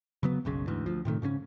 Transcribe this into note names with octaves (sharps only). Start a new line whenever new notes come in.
C#3 F#3 B3
F#1 B1 C#3
D2 G#2 E3
D2 F3
A2 C3 D#3 A3
G#2 C#3 B3 C#4